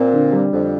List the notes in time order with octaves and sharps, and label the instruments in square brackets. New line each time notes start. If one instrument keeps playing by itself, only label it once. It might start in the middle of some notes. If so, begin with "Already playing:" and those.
Already playing: [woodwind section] A#2 [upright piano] C4
[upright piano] D3
G3
[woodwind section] F2 [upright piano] D3